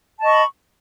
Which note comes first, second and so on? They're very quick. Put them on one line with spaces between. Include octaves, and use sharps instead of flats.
A5 D#5 C#6 B5